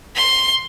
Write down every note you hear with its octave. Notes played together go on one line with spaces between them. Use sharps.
C6